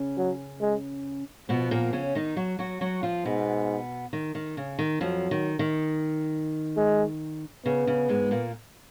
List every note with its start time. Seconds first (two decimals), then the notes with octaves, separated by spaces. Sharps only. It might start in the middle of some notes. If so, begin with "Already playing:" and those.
Already playing: C#3 C#4
0.17 F#3
0.61 G#3
1.49 B2 F3 B3
1.71 A#2 A#3
1.93 C#3 C#4
2.15 D#3 D#4
2.37 F#3 F#4
2.59 F#3 F#4
2.81 F#3 F#4
3.03 F3 F4
3.25 G#2 B2 B3
4.13 D#3
4.35 D#3
4.57 C#3
4.79 D#3
5.01 F2 F3 F#3
5.31 D#3
5.59 D#3
6.77 G#3
7.65 C#3 B3
7.87 C#3
8.09 G#2 G#3
8.31 A#2 A#3